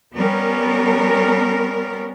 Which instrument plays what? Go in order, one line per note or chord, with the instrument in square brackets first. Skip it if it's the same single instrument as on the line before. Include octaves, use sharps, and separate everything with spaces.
[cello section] G3 B3 C#4 A#4